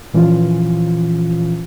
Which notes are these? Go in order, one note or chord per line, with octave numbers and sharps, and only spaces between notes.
A#2 E3 F3 C#4 F4